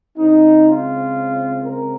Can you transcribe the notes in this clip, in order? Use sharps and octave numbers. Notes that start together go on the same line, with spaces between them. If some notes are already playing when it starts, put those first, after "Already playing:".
C#3 G#3 C4 D#4
F4
A#4